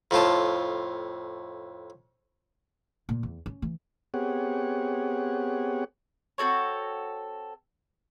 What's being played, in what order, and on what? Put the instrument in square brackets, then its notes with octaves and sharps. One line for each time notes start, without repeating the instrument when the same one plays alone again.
[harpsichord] F2 A2 F4 A5
[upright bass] A#2
E2
C#4
E3
[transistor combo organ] B3 C4 G4 G#4 C#5 F#5
[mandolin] C4 F#4 A4 C#5